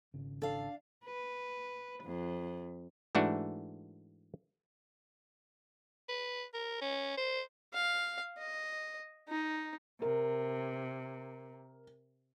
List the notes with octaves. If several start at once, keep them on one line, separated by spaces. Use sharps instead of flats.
G#1 C#3
D4 A4 F5
B4
F2
G#2 E3 A3 D4 F#4
B4
A#4
C#4
C5
F5
D#5
D#4
C3 A#4